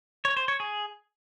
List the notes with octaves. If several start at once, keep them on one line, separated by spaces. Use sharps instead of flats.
C#5
C5
C#5
G#4